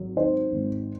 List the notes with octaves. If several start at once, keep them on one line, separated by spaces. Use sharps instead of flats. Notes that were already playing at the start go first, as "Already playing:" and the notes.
Already playing: G#1 F#3
D#3 C5
G#1